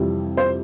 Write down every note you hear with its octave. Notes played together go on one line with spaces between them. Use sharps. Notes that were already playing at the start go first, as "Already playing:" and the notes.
Already playing: F2 C3 E3 G3
C5